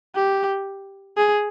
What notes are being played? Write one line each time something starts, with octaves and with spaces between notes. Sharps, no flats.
G4
G#4